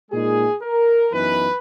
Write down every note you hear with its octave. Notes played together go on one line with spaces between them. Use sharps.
A#2 G#3 D#4 G#4
A#4
F#2 E3 B3 D#4 B4